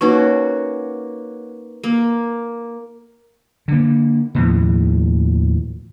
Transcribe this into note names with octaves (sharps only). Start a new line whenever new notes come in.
A#3 C#4 D#4 F#4 B4 C#6
A#3
D3 A#3
D#2 A2 F3